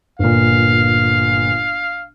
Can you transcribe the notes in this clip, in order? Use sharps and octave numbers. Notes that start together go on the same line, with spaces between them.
G1 A#2 F5